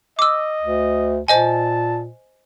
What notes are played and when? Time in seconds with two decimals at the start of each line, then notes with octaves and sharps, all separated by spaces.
0.19 D#5 D6 E6
0.61 D2
1.28 A#2 C5 D#5 G#5 A5